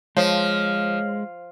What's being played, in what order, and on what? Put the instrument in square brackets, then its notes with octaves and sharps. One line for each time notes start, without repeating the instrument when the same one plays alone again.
[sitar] F3 [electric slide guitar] G#3 [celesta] C#5